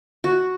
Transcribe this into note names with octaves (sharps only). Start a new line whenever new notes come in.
F#4